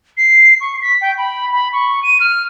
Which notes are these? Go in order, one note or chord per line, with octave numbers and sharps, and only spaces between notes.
C7
C#6
B6
G5
B5
B5
C#6
D#7
F6